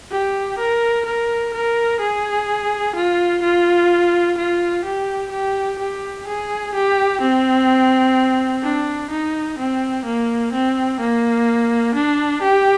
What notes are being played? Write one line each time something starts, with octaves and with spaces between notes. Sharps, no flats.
G4
A#4
A#4
A#4
G#4
F4
F4
F4
G4
G4
G4
G#4
G4
C4
D4
D#4
C4
A#3
C4
A#3
D4
G4